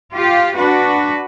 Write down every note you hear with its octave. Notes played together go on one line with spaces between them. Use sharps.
F4 G4 F5
D4 F#4 B4